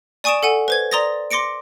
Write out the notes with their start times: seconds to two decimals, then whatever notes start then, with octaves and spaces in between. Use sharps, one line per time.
0.24 D5 G#5 C#6 D#6 D7 E7
0.43 A4 F#5 G#5
0.68 B4 C5 G#6
0.91 D5 A#5 C6 D#6 A6 A#6
1.31 C6 D6 A#6 C#7 D7